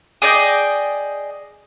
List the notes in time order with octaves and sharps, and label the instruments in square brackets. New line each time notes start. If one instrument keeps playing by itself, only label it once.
[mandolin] G#4 D5 D#5 G5